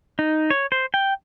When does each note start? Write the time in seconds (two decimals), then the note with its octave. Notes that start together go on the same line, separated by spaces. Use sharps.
0.19 D#4
0.50 C#5
0.72 C5
0.94 G5